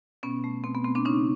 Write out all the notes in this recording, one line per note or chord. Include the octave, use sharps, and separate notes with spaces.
B2 B3 C#4
A3
B2 C4
B3
A3 C4
C4 D4
C#3 C#4 D#4